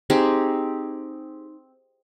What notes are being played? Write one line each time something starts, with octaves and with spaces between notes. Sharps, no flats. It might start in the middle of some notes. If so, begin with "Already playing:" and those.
C4 D#4 G4 G#4